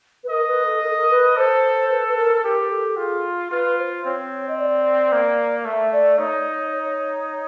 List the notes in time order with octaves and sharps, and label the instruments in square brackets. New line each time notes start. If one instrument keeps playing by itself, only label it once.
[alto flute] B4
[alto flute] A#4 [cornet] D#5
[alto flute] B4
A4
A#4
A4
A#4
B4
[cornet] A4 [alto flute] C5
[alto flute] B4
B4
A#4
[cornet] G4 [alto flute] A#4
[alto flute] A4
[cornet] F4 [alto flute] G#4
[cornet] F4 [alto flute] B4
[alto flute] C5
[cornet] C4 [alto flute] C#5
[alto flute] D#5
D5
[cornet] A#3
[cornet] A3 [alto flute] E5
[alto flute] D5
[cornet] D#4 [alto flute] C#5
[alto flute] C#5